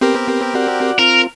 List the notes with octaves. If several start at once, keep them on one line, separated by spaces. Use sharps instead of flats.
B3 C4 G4 A#4
F#4 D5 F#5
C4 F4 A#4